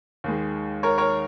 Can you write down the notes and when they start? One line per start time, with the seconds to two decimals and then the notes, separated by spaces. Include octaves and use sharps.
0.24 D#2 D#3 G#3
0.83 A#4 C#5
0.98 A#4 C#5